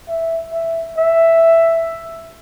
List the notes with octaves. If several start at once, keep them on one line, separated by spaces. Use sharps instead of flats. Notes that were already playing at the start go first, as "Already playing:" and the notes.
E5
E5
E5